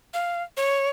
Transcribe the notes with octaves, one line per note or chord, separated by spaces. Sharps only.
F5
C#5